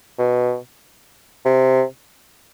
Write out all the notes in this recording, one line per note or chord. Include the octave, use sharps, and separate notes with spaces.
B2
C3